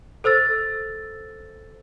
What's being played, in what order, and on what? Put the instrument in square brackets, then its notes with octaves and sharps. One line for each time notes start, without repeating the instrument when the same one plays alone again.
[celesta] A4 C5 E6 A6